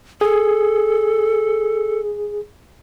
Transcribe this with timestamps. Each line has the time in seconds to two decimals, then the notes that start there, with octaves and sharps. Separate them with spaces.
0.21 G#4 A4